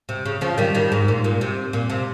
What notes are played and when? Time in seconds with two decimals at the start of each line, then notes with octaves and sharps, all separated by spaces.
0.09 C3
0.26 C#3
0.41 C#3 F3
0.58 D#3 G3
0.75 D#3 G3
0.92 G#2
1.08 A#2
1.24 A#2
1.41 C3
1.73 A#2
1.90 C3